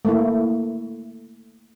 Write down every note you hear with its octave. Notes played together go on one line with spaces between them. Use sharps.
A3 A#3 E4